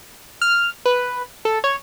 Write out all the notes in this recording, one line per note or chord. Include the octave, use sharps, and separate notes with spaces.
F6
B4
A4
C#5